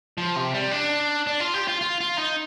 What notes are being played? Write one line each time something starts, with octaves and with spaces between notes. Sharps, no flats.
F3
C3
G3
D4
D4
F4
G4
F4
F4
F4
D#4